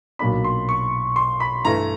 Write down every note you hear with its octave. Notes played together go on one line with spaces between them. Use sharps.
B1 A#2 F#3 A#3 D4 B5
C6
C#6
C6
B5
G2 E3 A3 A#5